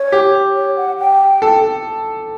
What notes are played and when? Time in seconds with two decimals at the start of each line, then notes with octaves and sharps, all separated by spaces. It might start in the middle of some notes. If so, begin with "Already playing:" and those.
Already playing: C#5
0.12 G4
0.56 C#5
0.77 F#5
0.99 G5
1.42 A4